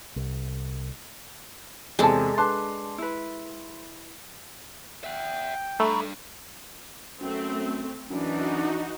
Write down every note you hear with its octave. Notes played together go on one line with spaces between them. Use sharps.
C2
E2 C3 G#3 A4 D5 A5
D4 B4 A5 C6
E4 B4
E5 F#5 G5
G3 A3 D4 A#5 B5 C#6
F#2 A3 C4
F#2 E3 D4 D#4 F#4